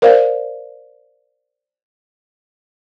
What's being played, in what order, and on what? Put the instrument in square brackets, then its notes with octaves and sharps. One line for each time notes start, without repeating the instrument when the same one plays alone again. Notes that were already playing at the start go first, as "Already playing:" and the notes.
[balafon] A#4 C5 D5 F5